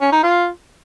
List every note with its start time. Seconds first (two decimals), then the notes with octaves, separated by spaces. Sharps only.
0.01 C#4
0.12 D#4
0.24 F4